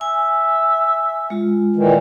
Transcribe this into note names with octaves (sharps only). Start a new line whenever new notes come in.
E5 G#5
G#3 F4
A#2 D#3 E3